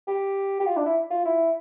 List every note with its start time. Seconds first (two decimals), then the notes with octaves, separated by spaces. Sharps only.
0.07 G4
0.60 G4
0.67 F4
0.76 D4
0.86 E4
1.11 F4
1.25 E4